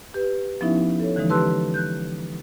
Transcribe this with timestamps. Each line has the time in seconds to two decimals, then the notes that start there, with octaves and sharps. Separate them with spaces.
0.14 G4 B4
0.61 F3 B3 C#4 D#4 E4 E5
1.00 A4 C#5
1.16 D3 E3 F3 G#3 D#4
1.29 G4 B4 A5 C6 E6 F#6
1.74 F#6 G6